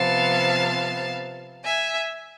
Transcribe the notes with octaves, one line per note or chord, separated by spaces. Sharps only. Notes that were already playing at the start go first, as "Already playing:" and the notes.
Already playing: C3 F3 B3 F5 A5
E5 G#5